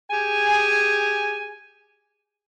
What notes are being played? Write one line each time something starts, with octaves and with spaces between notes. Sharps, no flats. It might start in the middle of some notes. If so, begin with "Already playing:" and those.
G4 G#4 G#5